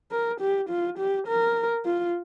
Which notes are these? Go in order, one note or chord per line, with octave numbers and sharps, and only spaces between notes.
A#4
G4
F4
G4
A#4
F4